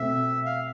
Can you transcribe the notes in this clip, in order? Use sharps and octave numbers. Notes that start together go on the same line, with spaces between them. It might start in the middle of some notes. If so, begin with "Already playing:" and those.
Already playing: B2 A3 C4 E5
F5